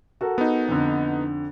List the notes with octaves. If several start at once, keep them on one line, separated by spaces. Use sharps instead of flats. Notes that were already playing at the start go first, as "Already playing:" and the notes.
F#4 A4 A#4
B3 D#4
F2 D3